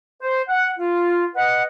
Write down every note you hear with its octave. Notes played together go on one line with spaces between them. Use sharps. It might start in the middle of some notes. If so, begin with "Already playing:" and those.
C5
F#5
F4
B4 D#5 F#5